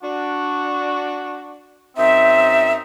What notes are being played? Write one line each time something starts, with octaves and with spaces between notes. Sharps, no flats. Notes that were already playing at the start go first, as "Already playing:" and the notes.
D4 F#4
F#2 C4 D#4 E5